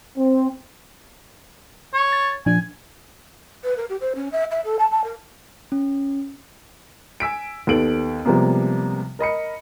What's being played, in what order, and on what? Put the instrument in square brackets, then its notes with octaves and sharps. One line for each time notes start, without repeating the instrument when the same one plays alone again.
[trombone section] C4
[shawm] C#5
[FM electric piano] A6
[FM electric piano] A#2 F3 D4 [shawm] G#5
[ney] B4
A#4
G4
C5
C#4
E5
E5
A4
A5
A5
A#4
[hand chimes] C#4
[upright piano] G#5 E6 B6 D7
D#2 B3 A4 D7 F#7
C3 F3 G3 G#3 A#3 B3
A#4 D#5 B5 C#7